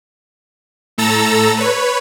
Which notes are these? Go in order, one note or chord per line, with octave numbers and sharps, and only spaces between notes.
A2 A4 A#5 E6 A6
B4 C#5